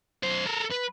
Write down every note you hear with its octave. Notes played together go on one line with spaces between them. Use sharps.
F#2 C5
A4 A#4
B4